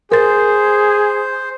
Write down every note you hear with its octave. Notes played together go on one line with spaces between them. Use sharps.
G#4 A#4 C5 A6